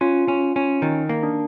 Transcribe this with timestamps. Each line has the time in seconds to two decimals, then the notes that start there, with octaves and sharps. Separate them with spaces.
0.01 C#4 F4
0.28 C#4
0.56 C#4
0.82 D#3 D#4
1.09 A#3
1.23 D4